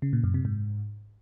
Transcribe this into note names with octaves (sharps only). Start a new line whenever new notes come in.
C#3
A#2
F#2
C3
G#2